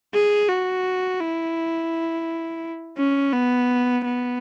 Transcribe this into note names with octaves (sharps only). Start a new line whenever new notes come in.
G#4
F#4
E4
C#4
B3
B3